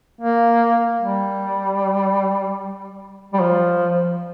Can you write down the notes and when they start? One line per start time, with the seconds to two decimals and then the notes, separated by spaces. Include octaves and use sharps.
0.21 A#3
1.01 G3
3.34 G3
3.41 F3